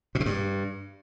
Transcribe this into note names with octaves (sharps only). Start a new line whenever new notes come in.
A#2
B2
G2